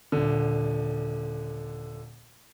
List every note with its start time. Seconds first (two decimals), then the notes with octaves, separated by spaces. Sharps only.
0.12 D#1 D3